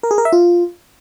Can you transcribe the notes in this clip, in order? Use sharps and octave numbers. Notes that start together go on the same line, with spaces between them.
A#4
G#4
A#4
E5
F4